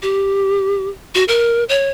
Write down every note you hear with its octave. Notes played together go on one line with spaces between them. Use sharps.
G4
F#4
A#4
C#5